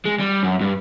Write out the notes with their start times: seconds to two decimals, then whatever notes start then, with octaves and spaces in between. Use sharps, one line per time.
0.06 G#3
0.20 G3
0.43 F#2
0.61 G2